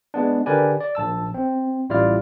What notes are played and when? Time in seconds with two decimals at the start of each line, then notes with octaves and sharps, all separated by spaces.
0.14 G#3 B3 D4
0.46 D3 G4 A#4 B4 D5 G#5
0.81 D5
0.95 A#1 A5 E6
1.34 C4
1.89 A1 G3 E4 F4 D5 F6